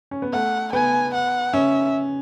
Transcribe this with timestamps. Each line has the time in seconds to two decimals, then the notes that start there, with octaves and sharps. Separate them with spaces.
0.11 C#4
0.22 B3
0.33 A3 F#5
0.73 B3 G#5
1.14 F#5
1.53 C#4 E5